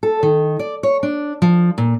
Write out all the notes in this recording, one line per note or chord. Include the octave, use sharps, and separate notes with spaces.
A4
D#3
D5
C#5
D4
F3
A#2